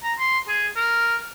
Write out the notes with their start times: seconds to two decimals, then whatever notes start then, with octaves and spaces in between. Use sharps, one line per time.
0.03 A#5
0.19 C6
0.48 G#4
0.76 A#4